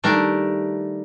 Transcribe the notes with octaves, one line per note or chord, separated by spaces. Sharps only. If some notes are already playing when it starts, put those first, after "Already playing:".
D#3 G3 A3 D4 G4 A#4